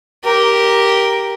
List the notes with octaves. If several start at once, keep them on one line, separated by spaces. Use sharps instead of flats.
G4 A#4